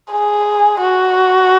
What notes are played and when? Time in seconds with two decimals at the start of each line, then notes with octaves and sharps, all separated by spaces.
0.12 G#4
0.81 F#4